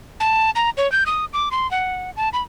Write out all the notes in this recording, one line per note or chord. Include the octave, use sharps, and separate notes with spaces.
A5
A#5
C#5
G6
D#6
D6
C6
F#5
A5
B5